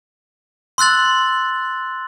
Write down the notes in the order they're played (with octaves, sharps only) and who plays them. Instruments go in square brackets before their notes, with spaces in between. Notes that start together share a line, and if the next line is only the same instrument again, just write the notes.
[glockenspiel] C6 E6 F#6 A6 F#7